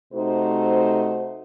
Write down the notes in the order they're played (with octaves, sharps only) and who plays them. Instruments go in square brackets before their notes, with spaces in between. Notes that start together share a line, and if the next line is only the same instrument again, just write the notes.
[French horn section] C3 A3 D#4 F#4 C5